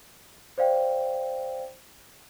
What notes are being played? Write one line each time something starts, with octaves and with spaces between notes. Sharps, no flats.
C5 D5 F5 G5